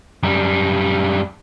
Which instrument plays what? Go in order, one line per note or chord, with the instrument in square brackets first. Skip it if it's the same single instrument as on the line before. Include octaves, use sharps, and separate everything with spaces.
[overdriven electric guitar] F#2 G3